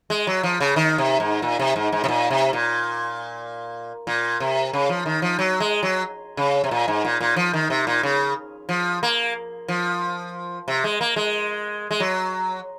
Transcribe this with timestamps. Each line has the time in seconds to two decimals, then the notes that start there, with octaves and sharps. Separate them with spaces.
0.10 G#3
0.27 F#3
0.43 F3
0.60 C#3
0.76 D#3
0.98 C3
1.20 G#2
1.42 A#2
1.59 C3
1.76 G#2
1.92 G#2
2.04 C3
2.08 A#2
2.30 C3
2.53 A#2
4.07 A#2
4.40 C3
4.73 C#3
4.89 F3
5.06 D#3
5.22 F3
5.39 F#3
5.60 G#3
5.83 F#3
6.37 C#3
6.64 C3
6.71 A#2
6.88 G#2
7.05 A#2
7.21 A#2
7.36 F3
7.53 D#3
7.70 C3
7.87 A#2
8.03 C#3
8.69 F3
9.03 A#3
9.68 F3
10.68 C3
10.84 G#3
11.01 A#3
11.16 G#3
11.91 G#3
12.00 F#3